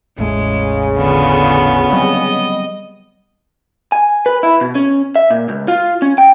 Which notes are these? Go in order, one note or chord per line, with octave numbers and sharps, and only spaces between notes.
A1 E2 A2 C#3 G#3
D3 B3 F4
F#3 G3 C4 D#5
G#5
B4
E4
B2
C#4
E5
A#2
C#2
F4
C#4
G5